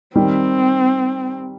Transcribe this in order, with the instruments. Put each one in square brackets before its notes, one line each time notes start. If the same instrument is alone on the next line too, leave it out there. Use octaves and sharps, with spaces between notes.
[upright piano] D#3 G3 [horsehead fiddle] C4